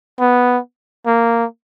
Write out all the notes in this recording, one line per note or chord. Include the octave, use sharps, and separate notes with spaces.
B3
A#3